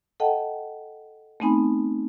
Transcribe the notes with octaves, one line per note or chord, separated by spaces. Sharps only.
A4 D#5 F#5 G5 A5
A3 B3 C4 D#4 G#5 B5